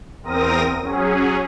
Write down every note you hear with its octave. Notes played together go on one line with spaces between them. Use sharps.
E2 C4 A#4 D#6 A#6
F#3 C#4 G#4